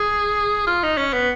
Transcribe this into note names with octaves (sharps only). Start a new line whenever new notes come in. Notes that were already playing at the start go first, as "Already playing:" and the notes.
Already playing: G#4
F4
D#4
C#4
B3